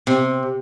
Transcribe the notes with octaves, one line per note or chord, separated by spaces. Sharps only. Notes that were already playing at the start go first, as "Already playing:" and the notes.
C3